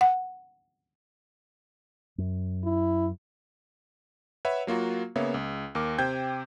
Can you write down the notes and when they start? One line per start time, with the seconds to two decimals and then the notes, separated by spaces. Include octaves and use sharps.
0.01 F#5
2.18 F#2
2.64 E4
4.45 B4 C#5 E5 F#5 B5
4.67 F#3 A#3 F4 F#4
5.16 C#3 A#3 B3 C#5 E5
5.34 C#2
5.75 D#2 A#4 D6
5.98 C3 C5 G5 G6 G#6